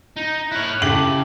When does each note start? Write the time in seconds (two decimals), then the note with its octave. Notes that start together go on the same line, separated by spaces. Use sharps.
0.17 D#4
0.52 E4 C#5 F6 F#6
0.82 C#3 E4 G4 A4 F#7